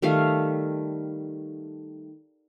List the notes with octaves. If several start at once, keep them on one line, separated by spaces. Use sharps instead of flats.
D#3 G3 A3 F5